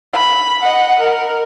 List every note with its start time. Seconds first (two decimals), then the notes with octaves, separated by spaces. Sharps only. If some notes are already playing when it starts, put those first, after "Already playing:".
0.13 B5
0.62 D#5 F#5
1.00 A#4